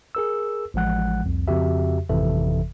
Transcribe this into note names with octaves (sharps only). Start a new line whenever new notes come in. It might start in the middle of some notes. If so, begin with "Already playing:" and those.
G#4 A#4 E6
A1 F3 G#3 F#5 F#6
C2 F2
F2 C#3 F#4 G4 E5
G#1 F2 C3 E3 A4 E5